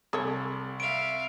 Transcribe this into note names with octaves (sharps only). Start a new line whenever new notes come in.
C2 G#4 A4 C#5
E5 F5 D7